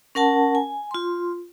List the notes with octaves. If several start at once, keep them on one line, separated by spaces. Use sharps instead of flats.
C#4 A#4 F#5 A5
G#5
F4 C6